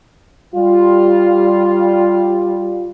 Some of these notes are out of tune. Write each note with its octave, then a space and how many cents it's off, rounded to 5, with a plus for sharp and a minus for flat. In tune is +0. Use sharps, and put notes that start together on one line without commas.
G3 +0 F4 +0